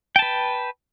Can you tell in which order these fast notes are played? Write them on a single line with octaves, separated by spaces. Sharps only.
G5 A5 B4